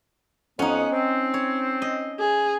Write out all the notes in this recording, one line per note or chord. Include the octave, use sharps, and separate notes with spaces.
F2 B3 C#4 D#4 F#5
C4
C#5
D#5
G#4